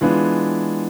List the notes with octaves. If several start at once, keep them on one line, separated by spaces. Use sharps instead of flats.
E3 G#3 B3 D4 F4